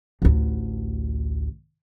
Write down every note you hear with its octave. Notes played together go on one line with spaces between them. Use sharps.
A1 D2